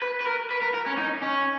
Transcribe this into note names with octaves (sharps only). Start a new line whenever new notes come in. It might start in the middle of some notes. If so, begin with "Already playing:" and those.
B4
B4
A#4
B4
A#4
A#4
C#4
D#4
C#4